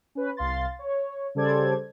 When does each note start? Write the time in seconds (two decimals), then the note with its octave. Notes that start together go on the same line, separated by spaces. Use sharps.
0.15 C#4 B4
0.37 C2 F5 C6 A6
0.79 C#5
1.35 C#3 G3 A4 C5 D5 G#6